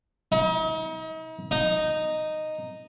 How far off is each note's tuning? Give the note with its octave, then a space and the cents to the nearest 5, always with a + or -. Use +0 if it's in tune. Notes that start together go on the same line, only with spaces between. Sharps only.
D#4 +40
D#4 -5